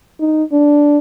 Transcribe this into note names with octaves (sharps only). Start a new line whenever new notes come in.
D#4
D4